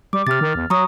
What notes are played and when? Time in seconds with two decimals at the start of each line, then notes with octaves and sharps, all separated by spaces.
0.13 G3 D6
0.27 C3 F6 A6
0.41 D#3
0.55 E2
0.70 F#3 A#5 C#6 D#6